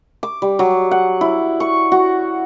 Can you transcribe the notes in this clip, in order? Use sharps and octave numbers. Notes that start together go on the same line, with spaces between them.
D6
G3
F#3
F#5
E4
C#6
F#4